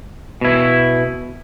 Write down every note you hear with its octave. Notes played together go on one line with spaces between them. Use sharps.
B2 E4